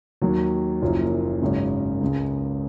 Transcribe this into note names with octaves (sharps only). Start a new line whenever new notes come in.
D#2 D#3 F#3
F#1 F#2 F3 A#3 F4
G#1 F#2 C#3
C#2 C#3 G#3